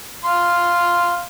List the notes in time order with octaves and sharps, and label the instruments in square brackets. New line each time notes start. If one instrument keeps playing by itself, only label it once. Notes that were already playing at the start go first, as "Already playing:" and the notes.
[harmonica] F5 C6